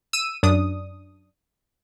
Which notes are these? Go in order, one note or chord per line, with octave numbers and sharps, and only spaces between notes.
E6 D#7
F#2 D4 D#6